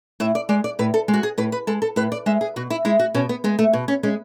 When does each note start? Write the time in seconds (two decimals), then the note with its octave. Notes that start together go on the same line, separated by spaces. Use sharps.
0.20 A2 E5
0.35 D5
0.49 G#3 D5
0.64 D5
0.79 A2 B4
0.94 A4
1.08 G#3
1.14 F#4
1.23 G#4
1.38 A2 B4
1.52 B4
1.67 G#3 A4
1.82 A4
1.96 A2 B4
2.12 D5
2.26 G#3 E5
2.41 G#4
2.56 B2 F#4
2.70 E4
2.85 G#3 E4
2.99 F#4
3.14 B2 C#4
3.29 B3
3.44 G#3 B3
3.59 A3
3.73 B2
3.88 C#4
4.03 G#3 C#4